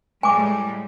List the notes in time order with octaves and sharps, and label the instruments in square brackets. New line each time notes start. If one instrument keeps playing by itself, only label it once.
[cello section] A2 G3 G#3 [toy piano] G#5 D6